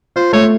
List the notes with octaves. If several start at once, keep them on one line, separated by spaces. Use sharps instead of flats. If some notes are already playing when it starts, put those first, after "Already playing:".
F4 C5
A3 C#5